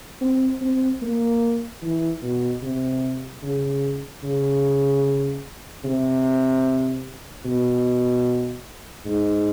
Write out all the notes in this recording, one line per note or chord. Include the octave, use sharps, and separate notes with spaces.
C4
C4
A#3
E3
B2
C3
C#3
C#3
C3
B2
G#2